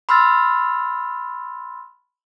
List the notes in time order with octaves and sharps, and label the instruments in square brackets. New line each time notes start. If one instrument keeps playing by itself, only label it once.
[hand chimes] B5 C6 E6 F6 A6